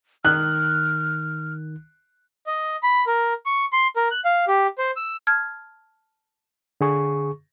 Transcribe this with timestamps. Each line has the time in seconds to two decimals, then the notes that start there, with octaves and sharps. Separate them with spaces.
0.25 D#3 F6 F#6
2.47 D#5
2.83 B5
3.07 A#4
3.46 C#6
3.73 C6
3.96 A#4
4.11 F#6
4.25 F5
4.48 G4
4.78 C5
4.97 E6
5.27 A5 F6 G#6
6.81 D3 G#4 C#6